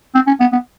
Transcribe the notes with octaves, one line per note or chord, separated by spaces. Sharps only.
C4
C#4
B3
B3